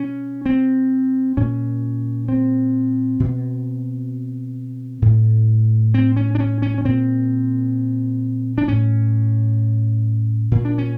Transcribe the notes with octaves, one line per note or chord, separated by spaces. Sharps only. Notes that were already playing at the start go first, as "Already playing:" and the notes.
Already playing: B2 C#4
C4
A#2 C#4
C4
B2
A2
C4
C#4
D4
C#4
C#4
C#4
A#2 C4
D4
A2 C#4
A#2
D4
C#4